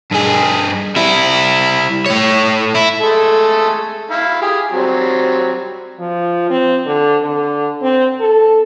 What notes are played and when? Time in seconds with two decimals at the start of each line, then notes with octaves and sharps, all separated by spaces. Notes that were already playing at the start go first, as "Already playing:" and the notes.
0.12 G2 G#4
0.96 G3 E4
2.06 A3 C#5
2.75 E4
3.00 G#3 A3 A4
4.11 E4 F5
4.42 G4 G#4
4.72 F#3 G3 C4
6.00 F3
6.50 C4
6.86 D3
7.22 D3
7.82 C4
8.20 A4